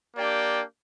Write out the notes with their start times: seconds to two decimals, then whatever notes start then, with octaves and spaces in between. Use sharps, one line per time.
0.15 A#3 D4 G4 D5 G5